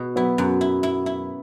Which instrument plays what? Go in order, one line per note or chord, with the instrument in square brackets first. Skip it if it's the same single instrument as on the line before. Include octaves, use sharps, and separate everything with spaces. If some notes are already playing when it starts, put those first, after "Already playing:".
Already playing: [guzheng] B2
[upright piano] F#3 B3 [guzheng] E4
[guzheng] F#2
E4
E4
E4